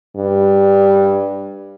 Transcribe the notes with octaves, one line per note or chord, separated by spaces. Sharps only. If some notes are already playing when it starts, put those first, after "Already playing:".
G2